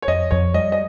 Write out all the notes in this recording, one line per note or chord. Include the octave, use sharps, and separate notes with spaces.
C#5
F2 D#5
F2 C#5
G3 D#5
D#5